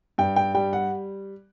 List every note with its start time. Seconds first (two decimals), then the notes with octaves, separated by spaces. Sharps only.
0.18 G2 G5
0.36 G5
0.54 G3 G5
0.73 F#5